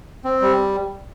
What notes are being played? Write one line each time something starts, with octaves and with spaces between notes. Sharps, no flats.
C4
G3